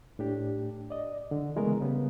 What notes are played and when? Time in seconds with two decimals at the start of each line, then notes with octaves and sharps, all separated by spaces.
0.19 A2 D4 G4
0.90 D5 D#5
1.31 D3
1.56 C#3 E3 G#3 A3 B3 A#4
1.81 C#3 G3 B3